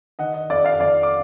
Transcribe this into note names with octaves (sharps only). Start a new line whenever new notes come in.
D#3 D#5 F#5
D#5
F2 D5 F5
D5 F5
F2 D5 F5
D6